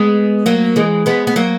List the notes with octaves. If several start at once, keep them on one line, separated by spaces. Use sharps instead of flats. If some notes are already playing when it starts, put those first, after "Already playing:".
Already playing: G#3 B3
F#3 A#3
E3 G#3
G#3 B3
B3
F#3 A#3